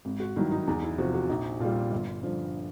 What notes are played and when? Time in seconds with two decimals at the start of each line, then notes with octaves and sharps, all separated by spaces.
0.05 G#1
0.20 F#4
0.36 G2 D#3 F#3 E4
0.52 D#4
0.67 E2 D#4
0.83 E4
0.98 C3 F3 F#4
1.14 F#4
1.29 A#1 D#4
1.60 A#2 G3 F4
1.92 G1
2.23 G2 D3 F3